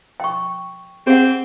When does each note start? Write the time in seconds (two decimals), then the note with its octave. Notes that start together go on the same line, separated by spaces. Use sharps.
0.20 G5 C#6
1.07 C4 G#4 F#5